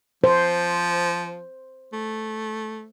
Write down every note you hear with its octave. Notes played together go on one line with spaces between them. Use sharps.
F3 C5
A3